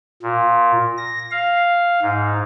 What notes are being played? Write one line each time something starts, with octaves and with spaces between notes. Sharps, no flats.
A#2
A#6
F5
G#2